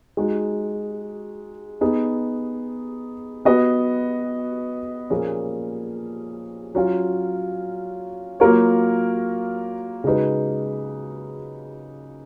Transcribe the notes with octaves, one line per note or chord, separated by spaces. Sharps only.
G#3 D#4 F#4
B3 D#4 G#4
B3 F#4 B4 D#5
A#2 F3 A#3 C#4 G#4
F#3 C#4 F4
F#3 A#3 F4 A#4 C#5
C#3 G#3 D#4 F#4 B4